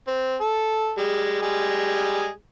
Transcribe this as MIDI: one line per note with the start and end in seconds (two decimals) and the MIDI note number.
0.08 0.36 60
0.41 0.93 69
0.98 1.38 55
0.98 1.38 56
1.42 2.30 55
1.42 2.30 56
1.42 2.30 68